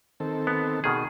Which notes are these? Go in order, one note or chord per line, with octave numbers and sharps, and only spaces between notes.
D#3 C4 A4
B3
B2 D#3 G#4